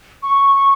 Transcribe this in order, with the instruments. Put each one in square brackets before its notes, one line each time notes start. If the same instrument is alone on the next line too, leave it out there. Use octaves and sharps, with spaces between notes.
[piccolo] C#6